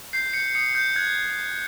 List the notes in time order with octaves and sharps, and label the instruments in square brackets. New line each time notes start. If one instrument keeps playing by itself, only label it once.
[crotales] G6 C7
G6 C#7
D#6 C#7
G6
F#6 G#6